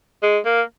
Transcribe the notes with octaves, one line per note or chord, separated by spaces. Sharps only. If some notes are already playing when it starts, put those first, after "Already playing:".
G#3
A#3